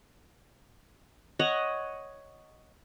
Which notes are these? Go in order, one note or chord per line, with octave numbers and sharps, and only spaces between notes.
C#5 D#5 F#5